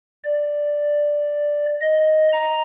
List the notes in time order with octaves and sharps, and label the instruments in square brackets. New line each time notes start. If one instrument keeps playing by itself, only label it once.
[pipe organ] D5
D#5
A#5